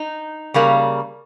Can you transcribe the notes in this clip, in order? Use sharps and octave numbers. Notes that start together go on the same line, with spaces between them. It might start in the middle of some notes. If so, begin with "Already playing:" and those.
Already playing: D#4
C#3 G3 A#3